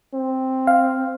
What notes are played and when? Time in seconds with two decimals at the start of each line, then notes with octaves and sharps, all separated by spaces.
0.14 C4
0.67 F5